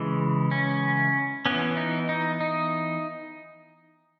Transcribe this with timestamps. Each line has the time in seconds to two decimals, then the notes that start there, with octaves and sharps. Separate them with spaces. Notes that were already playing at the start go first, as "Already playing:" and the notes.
Already playing: C#3 E3 G#3
0.51 C#4
1.46 E3 B3 C#4
1.77 D#4
2.09 D#4
2.41 D#4